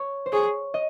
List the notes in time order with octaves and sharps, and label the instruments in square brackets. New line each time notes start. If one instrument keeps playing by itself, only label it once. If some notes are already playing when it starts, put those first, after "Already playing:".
Already playing: [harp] C#5
C5
[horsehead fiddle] G#4 [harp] C#5
[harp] D#5